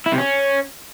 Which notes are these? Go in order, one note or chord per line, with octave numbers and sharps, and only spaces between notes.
E4
C3
C#4